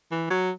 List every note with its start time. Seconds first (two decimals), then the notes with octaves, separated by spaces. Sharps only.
0.11 E3
0.30 F#3